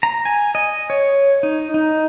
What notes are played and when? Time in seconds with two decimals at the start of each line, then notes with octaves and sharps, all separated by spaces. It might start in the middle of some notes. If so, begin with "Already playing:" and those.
0.03 A#5
0.25 G#5
0.55 D#5
0.90 C#5
1.43 D#4
1.74 D#4